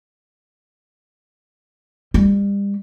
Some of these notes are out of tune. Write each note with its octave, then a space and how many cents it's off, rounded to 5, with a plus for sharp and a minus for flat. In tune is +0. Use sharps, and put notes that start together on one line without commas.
G3 +35